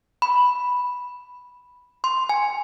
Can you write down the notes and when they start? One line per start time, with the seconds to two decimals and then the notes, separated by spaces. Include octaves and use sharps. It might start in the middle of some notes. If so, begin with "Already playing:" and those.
0.22 B5
2.04 C6
2.29 G#5